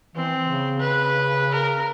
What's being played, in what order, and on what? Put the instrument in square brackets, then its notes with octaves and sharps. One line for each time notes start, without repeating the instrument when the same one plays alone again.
[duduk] E3 [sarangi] C4
[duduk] C#3
[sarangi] B4
A#4